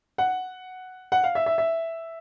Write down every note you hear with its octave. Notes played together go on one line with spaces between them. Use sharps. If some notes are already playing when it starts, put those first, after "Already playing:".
F#5
F#5
F5
E5
E5
E5